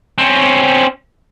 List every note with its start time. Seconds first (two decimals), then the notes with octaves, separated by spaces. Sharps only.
0.18 C4 C#4